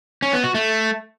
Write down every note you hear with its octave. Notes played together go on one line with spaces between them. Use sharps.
C#4
B3
F#4
A3